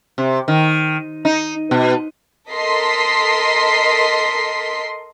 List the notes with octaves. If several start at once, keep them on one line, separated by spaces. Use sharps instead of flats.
C3
D#3
D#4
B2
A4 A#4 D#5 C6 B6 C7